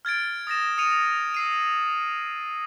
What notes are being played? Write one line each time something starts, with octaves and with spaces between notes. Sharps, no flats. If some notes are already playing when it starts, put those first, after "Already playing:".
F6 G#6 A6 D7
D#6 A6 A#6 E7
D#6 C#7 D#7 F7
E6 C7 D#7